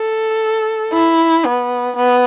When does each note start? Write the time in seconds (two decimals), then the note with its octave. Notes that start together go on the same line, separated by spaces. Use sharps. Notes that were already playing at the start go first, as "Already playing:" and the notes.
Already playing: A4
0.94 E4
1.45 B3
1.96 B3